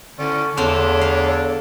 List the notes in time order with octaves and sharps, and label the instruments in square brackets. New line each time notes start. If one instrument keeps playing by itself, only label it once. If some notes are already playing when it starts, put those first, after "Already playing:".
[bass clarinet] D3 [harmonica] C#4 D5 [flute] E4
[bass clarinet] E2 [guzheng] D3 C5 F5 [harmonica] A3 D4 A4 [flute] C#5
[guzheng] F5